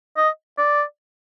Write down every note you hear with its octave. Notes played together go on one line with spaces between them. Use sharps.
D#5
D5